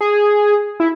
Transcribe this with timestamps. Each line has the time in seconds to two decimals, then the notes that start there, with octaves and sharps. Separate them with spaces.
0.01 G#4
0.80 E4